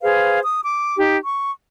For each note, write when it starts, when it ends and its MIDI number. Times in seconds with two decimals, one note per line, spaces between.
0.01 0.39 68
0.01 0.39 71
0.01 0.39 72
0.01 0.39 77
0.44 0.60 87
0.64 0.95 86
0.97 1.18 63
0.97 1.18 67
1.23 1.51 85